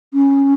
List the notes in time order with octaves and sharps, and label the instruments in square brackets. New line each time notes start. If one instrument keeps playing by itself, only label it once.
[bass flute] C#4